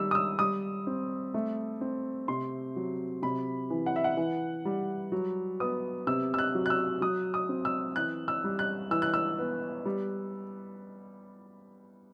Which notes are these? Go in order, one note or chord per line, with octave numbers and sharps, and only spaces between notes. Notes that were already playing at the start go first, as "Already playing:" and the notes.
Already playing: D#3 G3 E6
D#6
E6
G3 D#6
C4
A3
C4
C3 C6
F#3
C3 B5
E3
F#5
E5
F#5
E3
G3
F#3
B3 D#6
C3 E6
E6
F#6
F#3
F#6
E6
F#3 D#6
D#6
C4
E6
E3 F#6
E6
G3
F#6
E3 E6
F#6
E6
B3
G3